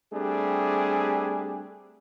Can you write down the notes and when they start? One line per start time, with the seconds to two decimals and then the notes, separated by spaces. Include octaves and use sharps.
0.14 G3 A3 C4 D4 G4 G#4